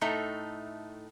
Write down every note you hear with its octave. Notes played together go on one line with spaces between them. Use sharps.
A2 A3 D#4 A#5